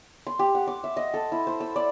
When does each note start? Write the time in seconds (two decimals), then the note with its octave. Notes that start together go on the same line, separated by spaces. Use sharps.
0.27 C6
0.39 G4
0.55 F#5
0.67 D6
0.84 E5
0.97 D#5
1.14 A4
1.32 E4
1.47 C5
1.60 E6
1.76 D5